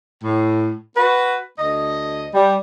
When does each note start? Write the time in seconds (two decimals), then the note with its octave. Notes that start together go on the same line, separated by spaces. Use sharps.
0.23 A2
0.95 F#4 B4
1.59 D2 D#5
2.34 G3